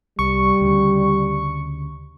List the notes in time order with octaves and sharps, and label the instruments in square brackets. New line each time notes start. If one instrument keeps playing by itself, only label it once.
[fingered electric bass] C2 [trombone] G3 [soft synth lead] C#6
[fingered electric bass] D2 C#3